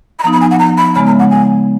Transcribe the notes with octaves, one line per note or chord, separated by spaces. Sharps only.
B5
F3 B3 D#4 A#5
B5
G#5
F#5
A#5
B5
C#3 G#3 B3 B5
A#5
F#5
G#5